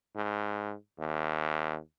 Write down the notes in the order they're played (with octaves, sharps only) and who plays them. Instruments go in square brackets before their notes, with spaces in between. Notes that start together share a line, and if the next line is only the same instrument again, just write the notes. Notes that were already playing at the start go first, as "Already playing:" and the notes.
[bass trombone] G#2
D#2